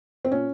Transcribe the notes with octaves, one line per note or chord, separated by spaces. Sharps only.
C4
A#2 C#4